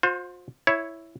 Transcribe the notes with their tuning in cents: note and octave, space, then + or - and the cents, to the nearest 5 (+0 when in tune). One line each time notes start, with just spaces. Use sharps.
F4 +45 C5 +10
E4 +0 C#5 +0